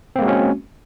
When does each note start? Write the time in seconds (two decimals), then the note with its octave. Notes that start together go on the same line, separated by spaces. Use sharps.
0.16 C4
0.19 A#3
0.22 G#3
0.25 F#4
0.28 C#4